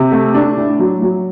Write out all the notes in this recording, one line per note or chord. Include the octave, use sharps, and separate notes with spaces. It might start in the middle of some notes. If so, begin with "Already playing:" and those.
Already playing: C3
A3
D4
A2
F#3
F#3